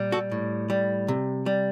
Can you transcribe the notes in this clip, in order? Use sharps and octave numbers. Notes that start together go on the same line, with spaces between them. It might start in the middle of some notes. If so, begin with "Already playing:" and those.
Already playing: A#2 G3
F#4 A4
A2
G3
C3
G3